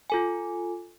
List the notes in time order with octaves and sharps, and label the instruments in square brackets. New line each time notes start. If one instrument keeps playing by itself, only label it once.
[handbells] F4 A4 G#5